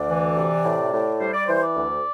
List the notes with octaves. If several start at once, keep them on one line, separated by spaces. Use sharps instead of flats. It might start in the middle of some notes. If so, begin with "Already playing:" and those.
Already playing: D2 D5
E3
C3
A2
A2
G3 C5
D5
E3 C5
D5
D2